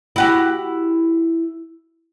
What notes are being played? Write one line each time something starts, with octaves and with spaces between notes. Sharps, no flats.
E4 F#4 G4